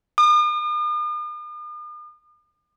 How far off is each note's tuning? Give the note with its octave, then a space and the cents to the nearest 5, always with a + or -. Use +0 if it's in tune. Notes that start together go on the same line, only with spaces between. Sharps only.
D#6 -45